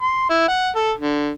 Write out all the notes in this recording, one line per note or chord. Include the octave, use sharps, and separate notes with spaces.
C6
E4
F#5
A4
D3